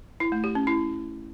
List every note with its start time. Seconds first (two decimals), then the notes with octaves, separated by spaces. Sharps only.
0.20 E4
0.32 A3
0.44 G4
0.55 C#4
0.67 E4